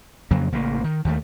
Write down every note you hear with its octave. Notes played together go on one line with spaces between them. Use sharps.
F2 C#3 F#3 A#3
A1 C#3 A#3
D#3
D#2 D#3 A3